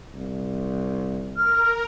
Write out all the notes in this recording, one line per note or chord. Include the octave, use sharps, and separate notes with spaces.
C2
A#4 F6